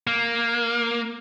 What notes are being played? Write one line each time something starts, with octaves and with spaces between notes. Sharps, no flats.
A#3